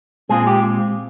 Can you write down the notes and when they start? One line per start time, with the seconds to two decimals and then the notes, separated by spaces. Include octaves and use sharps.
0.29 A#2 G#3 C4 F4 G#4
0.47 G4